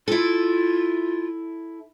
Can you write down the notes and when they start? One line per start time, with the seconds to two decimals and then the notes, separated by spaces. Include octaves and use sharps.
0.08 E4 F4 A4